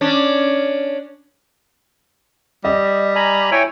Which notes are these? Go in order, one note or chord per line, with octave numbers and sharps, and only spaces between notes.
C#4 D4
G3 D#5
G#5 A#5 B5
E4 C#5 G5 G#5